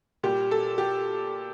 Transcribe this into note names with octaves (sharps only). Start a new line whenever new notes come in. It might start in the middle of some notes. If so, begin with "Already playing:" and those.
A#2 G3 G4
A4
G4